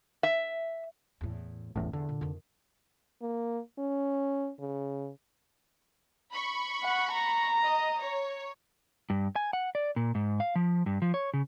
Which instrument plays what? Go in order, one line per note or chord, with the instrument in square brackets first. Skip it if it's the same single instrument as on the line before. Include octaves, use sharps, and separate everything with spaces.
[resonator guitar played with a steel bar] E5
[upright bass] E2 A2
[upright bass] D1 C#4 [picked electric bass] G1 E2 A2
[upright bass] E2 [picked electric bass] D3
[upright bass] A#2
F2 D#3
[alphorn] A#3
C#4
C#3
[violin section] B5 C#6
[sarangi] F#5
A#5
[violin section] D#5
C#5
[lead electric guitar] G2
G#5
F#5
D5
A#2
G#2
F5
F3
G2
F3
C#5
C#3